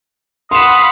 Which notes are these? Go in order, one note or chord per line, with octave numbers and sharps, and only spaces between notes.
F5 F#5 B5 C6 D#6 E7